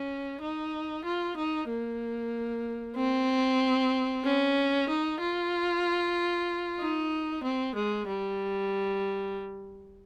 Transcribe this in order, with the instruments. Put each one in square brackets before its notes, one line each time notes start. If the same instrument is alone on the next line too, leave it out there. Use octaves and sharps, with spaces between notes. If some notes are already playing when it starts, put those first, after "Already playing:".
Already playing: [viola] C#4
D#4
F4
D#4
A#3
C4
C#4
D#4
F4
D#4
C4
G#3
G3